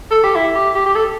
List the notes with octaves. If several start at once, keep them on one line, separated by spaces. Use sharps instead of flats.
A4
G4
E4
G4
G4
G4
A4